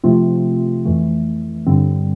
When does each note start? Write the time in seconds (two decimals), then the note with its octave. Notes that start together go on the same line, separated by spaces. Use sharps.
0.04 C3 F3 A3 C4 F4
0.86 F2 E3 A3
1.67 G2 D3 G3 C4